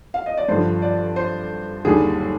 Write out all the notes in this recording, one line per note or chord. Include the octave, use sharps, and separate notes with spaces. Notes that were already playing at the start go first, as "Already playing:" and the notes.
F5
D#5
D5
G2 D3 F3 C5
D5
C5
D#2 D3 G3 G#4